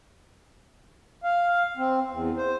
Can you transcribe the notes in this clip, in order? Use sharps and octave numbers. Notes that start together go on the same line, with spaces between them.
F5
C4
E2
C5